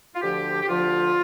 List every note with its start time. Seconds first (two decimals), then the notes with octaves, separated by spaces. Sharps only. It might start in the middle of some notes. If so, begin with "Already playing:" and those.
0.15 F4
0.21 D2 D3 F3 G4
0.62 G4
0.68 D2 D3 F3 F4